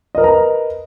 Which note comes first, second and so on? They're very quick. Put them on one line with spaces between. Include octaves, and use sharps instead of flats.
D#5 A#4 B4 A#5